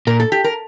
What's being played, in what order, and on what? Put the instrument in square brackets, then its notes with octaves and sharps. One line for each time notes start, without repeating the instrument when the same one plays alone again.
[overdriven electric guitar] A#2 [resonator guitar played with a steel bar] A#4
[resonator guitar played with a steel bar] A4
G4
A#4